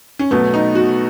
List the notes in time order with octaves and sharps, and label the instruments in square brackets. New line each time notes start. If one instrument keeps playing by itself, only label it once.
[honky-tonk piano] C#4
[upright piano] B2 F#3 A3 [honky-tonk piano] B3
[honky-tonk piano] D#4
F#4